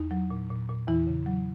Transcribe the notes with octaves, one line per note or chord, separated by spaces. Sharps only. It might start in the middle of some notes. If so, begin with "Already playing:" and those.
Already playing: E2 D#4
F#3
A#2
A#2
A#2
E2 E3 E4
C#3
F#3